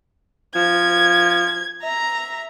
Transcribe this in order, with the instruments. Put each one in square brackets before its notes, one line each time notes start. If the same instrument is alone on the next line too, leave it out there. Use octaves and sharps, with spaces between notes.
[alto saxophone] F3 [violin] G#6
[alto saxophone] E5 [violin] A#5